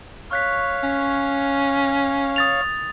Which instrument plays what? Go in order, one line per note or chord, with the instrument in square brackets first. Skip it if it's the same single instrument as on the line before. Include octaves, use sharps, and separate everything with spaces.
[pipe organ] C#5 F5 [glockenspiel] C#6 F#6 B6
[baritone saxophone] C#4
[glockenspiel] D#6 A6 F7